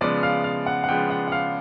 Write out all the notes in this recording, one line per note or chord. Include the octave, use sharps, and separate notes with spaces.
C#3 F3 G#3 B3 D5
F5
F5
F#5
F#5
C#3 F3 G#3 B3 G5
F#5
F#5
F5